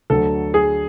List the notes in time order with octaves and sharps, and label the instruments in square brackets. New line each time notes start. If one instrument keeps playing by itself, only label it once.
[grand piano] D2 D3 F#3 [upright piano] A4
[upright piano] G#4